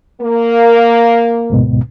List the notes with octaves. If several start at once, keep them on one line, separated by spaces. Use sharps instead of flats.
A#3
D2 G#2 B2